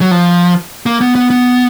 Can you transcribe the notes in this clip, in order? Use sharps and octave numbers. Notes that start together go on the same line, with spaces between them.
F#3
F3
A#3
B3
B3
B3